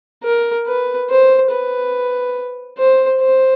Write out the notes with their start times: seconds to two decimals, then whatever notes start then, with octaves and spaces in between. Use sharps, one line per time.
0.23 A#4
0.67 B4
1.09 C5
1.50 B4
2.78 C5
3.20 C5